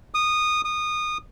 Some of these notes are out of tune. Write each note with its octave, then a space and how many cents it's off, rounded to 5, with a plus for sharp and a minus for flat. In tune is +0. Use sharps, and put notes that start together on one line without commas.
D#6 -15
D#6 -20